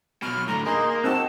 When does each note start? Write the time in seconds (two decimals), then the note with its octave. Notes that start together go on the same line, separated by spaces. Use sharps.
0.23 B2 F#3 F6
0.47 A2 D3 A#5
0.66 A#3 D#4 G#4 C6
1.04 C4 D#4 F#4 A5 E6